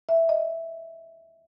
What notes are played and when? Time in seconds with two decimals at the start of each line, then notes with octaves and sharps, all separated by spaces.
0.09 E5
0.29 D#5